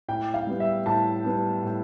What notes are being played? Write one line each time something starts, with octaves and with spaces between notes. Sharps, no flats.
A2 G5
F5
G3 B3
E5
A2 A5
G3 B3
A2